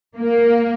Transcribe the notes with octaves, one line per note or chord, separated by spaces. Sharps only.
A#3